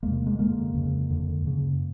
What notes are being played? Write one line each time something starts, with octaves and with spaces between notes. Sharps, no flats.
E2 C3 G#3 A#3
G#3 A#3
F#2 D3 G#3 A#3
F2 C#3
F2 D3
F#2 C#3